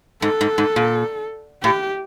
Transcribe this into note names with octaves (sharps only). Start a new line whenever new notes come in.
G#2 A4
G#2
G#2
A#2
A2 G4